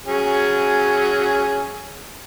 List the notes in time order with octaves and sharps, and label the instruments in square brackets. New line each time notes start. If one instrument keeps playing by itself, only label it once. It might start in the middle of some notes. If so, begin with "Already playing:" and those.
[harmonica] F#3 C#4 G#4